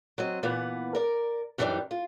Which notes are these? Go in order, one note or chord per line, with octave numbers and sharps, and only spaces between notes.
F#3 C4 D#5
A#2 E3 B3 B4 F#5
A#4 D5
F#2 E3 G3 G#3 D4 D#4
F4